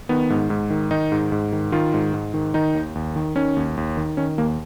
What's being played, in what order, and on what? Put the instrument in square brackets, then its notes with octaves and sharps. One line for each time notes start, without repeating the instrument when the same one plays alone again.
[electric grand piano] D#3 B3
G#2
G#2
D#3
D#3 D#4
G#2
G#2
D#3
D#3 F4
G#2
G#2
D#3
D#3 D#4
D#2
D#2
D#3
D#3 C#4
D#2
D#2
D#3
D#3 C#4
D#2 A#3